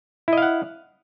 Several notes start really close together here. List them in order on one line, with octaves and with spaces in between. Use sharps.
E4 D#5 F5 F#5